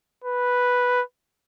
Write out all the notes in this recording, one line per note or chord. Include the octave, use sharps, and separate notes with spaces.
B4